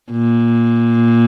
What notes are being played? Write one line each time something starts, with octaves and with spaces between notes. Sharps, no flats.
A#2